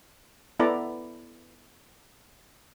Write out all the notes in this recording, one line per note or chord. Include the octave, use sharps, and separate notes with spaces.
B3 E4 A4 D5 A#5